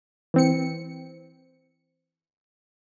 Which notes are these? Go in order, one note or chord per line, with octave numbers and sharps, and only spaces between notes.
E3 C4 C#7